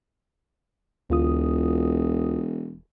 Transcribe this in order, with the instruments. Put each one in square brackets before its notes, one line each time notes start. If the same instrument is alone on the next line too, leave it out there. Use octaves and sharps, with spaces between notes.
[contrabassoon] E1 [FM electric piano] D2 F4 D#6